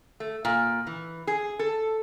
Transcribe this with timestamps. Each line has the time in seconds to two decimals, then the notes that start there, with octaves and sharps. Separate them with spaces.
0.20 A3
0.45 A#2
0.87 E3
1.27 G#4
1.59 A4